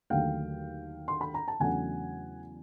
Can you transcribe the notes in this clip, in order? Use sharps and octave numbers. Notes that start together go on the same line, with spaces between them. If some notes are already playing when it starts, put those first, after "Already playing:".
D#2 D3 F#3 A3 F5 G5
C6
B5
A#5
A5
E2 C#3 F#3 A3 D4 F#5 G#5